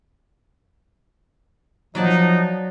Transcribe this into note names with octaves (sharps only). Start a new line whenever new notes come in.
F3 F#3 D#4 D5 A5